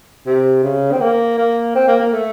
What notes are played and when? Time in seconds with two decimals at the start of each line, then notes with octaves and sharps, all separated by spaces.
0.26 C3
0.64 C#3
0.92 C4
1.01 A#3
1.38 A#3
1.75 C4
1.88 A#3
2.00 A#3
2.13 A3